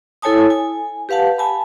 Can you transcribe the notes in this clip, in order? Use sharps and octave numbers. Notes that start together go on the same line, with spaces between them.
E4 A4 C#5 G#5 A5 D#6
G#5
G4 B4 F5 F#5 A5
G#5 A5 B5